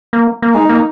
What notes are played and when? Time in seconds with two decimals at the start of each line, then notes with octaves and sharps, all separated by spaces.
0.13 A#3
0.42 A#3
0.54 G#3 D#4
0.69 A#3